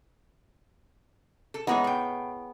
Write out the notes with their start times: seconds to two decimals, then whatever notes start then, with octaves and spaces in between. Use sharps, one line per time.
1.54 A4
1.67 E3 G#3 B3 D#4 G#4 C#5
1.84 A2 G5